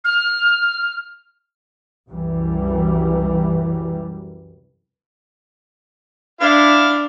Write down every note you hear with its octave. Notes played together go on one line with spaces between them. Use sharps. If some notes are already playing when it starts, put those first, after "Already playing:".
F6
C2 F#2 E3 G3
D4 E4 F5